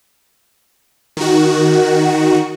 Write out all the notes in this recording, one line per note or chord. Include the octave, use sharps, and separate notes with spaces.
D#3 F#4